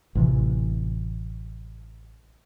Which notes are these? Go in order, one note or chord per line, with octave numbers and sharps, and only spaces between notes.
A1 C3 E3